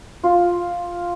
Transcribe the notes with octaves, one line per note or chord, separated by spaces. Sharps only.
F4